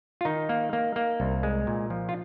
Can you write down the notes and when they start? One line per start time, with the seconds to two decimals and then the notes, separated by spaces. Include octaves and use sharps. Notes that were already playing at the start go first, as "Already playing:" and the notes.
0.21 F4
0.25 D#3 D#4
0.49 A#3
0.73 A#3
0.96 A#3
1.20 C2
1.43 G#3
1.67 A#2
1.90 F3
2.09 F4